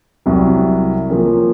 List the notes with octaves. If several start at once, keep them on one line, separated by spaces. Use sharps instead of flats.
C2 C3 F#3
F3 A#3 C#4